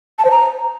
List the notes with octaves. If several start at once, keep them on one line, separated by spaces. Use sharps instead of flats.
A5
C5
A#5